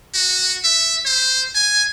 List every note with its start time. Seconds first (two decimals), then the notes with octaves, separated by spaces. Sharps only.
0.14 F#4
0.64 E5
1.06 C5
1.55 G#5